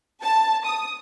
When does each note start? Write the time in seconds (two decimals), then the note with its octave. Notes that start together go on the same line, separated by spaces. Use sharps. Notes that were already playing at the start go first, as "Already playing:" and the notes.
0.22 A5
0.65 D#6